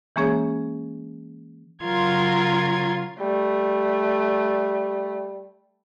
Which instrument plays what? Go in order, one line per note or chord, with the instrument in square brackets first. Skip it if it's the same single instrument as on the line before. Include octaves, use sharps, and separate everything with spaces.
[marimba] E3 G#3 A#3 C#4 G#4 C#5
[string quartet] C#3 F#3 F4 A#4 C6 G#6
[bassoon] G3 [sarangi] A3